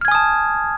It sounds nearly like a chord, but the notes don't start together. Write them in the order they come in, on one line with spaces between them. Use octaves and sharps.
F6 G#6 G#5 D#6 A5